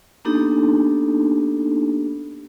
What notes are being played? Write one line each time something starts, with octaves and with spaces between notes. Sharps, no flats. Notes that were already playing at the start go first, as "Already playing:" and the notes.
A#3 B3 D4 D#4 G4 A4